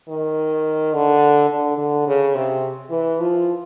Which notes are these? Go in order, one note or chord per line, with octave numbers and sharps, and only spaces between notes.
D#3
D3
D3
D3
C#3
C3
E3
F3